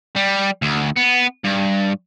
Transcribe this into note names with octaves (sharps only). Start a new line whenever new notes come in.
G3
D2
B3
G2